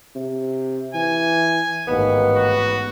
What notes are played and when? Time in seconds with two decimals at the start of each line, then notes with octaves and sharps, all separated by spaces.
0.15 C3
0.94 E3 G#5
1.88 A1 D#2 G#2 B3
2.36 F#4